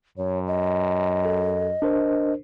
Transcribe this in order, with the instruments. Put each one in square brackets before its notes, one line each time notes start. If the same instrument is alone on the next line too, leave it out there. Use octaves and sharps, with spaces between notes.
[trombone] F#2 [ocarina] C#5
[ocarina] D#5
[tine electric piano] A4
D4 A#4 C5